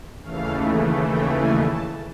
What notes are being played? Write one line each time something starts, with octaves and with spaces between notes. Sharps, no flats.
D#2 C#3 E3 A3 F5
G5
G#5
A5